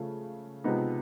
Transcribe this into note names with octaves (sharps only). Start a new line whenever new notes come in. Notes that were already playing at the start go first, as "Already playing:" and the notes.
Already playing: C#3 F3 A3
C3 F3 G#3 B3 D#4